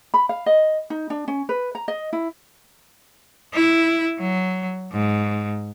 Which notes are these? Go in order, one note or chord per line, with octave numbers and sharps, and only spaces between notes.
B5
F5
D#5
D#4
D4
C#4
B4
A#5
D#5
E4
E4
F#3
G#2